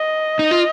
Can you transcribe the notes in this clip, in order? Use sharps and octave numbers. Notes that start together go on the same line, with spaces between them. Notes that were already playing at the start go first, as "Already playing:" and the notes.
Already playing: D#5
D#4
F4